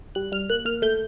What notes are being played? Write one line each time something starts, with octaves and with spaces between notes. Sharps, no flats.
G3 F#6
G3 F6
A#3 F#6
A#3 F6
A3 G6